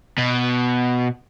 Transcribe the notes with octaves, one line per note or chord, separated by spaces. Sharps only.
B2